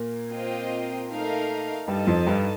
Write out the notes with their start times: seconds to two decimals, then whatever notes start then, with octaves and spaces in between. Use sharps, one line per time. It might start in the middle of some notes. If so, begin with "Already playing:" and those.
Already playing: A#2 A#3
0.33 C4 F4 C5 D#5 G5
1.11 A3 D#4 A#4 F5
1.88 G2 G3 D#4 A4 D#5 A5
2.07 F2 F3
2.26 G2 G3